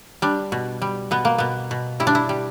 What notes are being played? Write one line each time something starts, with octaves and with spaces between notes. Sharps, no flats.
G3 D4
B2
G3
B2 B3
A#3
B2 B3
B2
G3 E4
D4
E4
G3